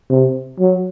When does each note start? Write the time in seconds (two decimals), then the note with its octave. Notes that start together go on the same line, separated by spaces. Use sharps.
0.10 C3
0.60 F#3